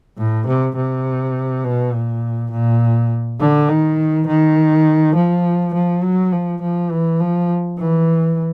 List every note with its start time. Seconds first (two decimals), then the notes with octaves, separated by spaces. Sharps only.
0.18 A2
0.47 C3
0.76 C3
1.64 B2
1.93 A#2
2.52 A#2
3.40 D3
3.69 D#3
4.27 D#3
5.16 F3
5.74 F3
6.03 F#3
6.32 F3
6.62 F3
6.91 E3
7.20 F3
7.79 E3